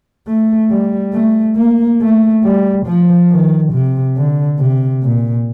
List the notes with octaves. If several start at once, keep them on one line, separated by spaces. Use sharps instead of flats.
A3
G3
A3
A#3
A3
G3
F3
D#3
C3
D3
C3
A#2